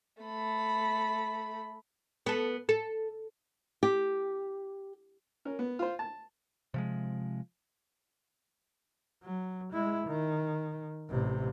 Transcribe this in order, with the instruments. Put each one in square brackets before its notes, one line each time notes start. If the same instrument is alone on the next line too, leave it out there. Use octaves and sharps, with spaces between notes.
[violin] A3 B5
[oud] B3 A4
A4
[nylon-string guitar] G4
[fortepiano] C#4 A#4
B3
F4 C5
A5
[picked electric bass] C3 F3 G#3
[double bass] F#3
G#3 E4
D#3
A1 C3